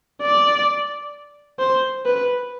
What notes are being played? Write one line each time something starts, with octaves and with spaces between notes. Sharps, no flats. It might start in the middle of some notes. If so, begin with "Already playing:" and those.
D5
C5
B4